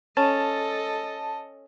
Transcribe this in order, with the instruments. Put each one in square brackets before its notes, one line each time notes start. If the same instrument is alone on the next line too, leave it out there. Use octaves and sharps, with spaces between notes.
[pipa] C#4 [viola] A4 D#5 [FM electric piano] A5